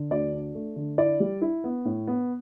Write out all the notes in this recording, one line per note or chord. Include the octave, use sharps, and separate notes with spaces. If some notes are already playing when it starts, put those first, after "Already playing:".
Already playing: D3
D2 D5
D4
A3
D3
E4 D5
G3
E4
B3
A2
B3